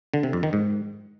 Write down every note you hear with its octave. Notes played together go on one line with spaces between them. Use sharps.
D3
C3
F2
D#3
G#2